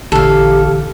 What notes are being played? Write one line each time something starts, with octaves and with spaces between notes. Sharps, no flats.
A1 A#2 D3 E3 G4 A4 F5